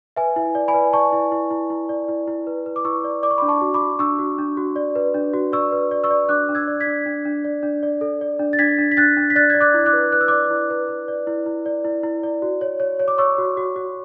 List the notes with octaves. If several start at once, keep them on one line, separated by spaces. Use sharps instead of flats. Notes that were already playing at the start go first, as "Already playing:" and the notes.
B4 E5 G#5
E4
D5
G#5 B5
B4
D5 A5 C#6
E4
E4
E4
E4
D5
E4
E4
B4
B4
D6
E4 C#6 E6
D5
D5 D6
C#6
B5 D6
D4
A5 C#6
F#4
B5 D6
F#4
D4 C#6 E6
F#4
D4
F#4
D5
B4
D4
F#4
D5 C#6 E6
B4
D5
C#6 E6
D5
D4 D6 F#6
D4
E6 G#6
D5
G#6 B6
D4
D4
D4
D5
D4
D5
A4
D5
D4
A6
D4 G#6 B6
D4
B6
D4 F#6 A6
D4
B6
D5 F#6 A6
D5 G#6
D6 F#6
E4
D6 F#6
B4
B4 F#6
E6
D5 D6 F#6
E4
B4
B4
D5
E4
E4
D5
E4
E4
D5
F#4
C#5
C#5
C#5
D6
C#5 C#6 E6
F#4
F#4
F#4